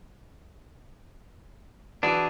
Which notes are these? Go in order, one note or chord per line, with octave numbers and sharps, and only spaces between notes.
E3 D4 F#4 G#4